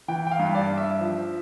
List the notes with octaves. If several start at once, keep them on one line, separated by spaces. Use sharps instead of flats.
E3 G5
G5
F5
G2
D5
G2
E5
F3